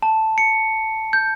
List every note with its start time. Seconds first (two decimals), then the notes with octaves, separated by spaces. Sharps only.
0.02 A5
0.38 C#7
1.13 G6